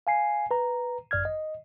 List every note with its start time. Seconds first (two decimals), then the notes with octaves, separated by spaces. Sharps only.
0.07 F5 G#5 C7
0.51 B4 A#5
1.11 G1 F#2 D5 F6 G#6
1.25 D#5